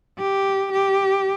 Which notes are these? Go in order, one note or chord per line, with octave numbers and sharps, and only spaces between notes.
G4
G4